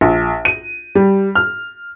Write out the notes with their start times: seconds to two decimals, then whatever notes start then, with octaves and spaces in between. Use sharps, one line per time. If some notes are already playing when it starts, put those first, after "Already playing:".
0.01 A#1
0.45 D#7
0.95 G3
1.35 F6